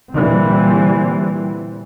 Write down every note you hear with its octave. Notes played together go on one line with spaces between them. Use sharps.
A#2 D3 E3 G3 C4